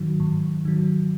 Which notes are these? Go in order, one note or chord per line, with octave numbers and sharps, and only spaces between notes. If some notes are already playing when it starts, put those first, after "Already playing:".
Already playing: G#2 D#3 F#3
G#2
D#3 F#3